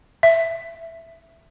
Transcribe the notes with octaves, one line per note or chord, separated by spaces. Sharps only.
E5